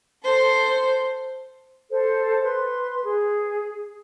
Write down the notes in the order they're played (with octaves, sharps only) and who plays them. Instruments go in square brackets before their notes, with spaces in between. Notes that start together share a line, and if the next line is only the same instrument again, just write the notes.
[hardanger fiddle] A4 C5
[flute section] A4 C5
B4 C6
G#4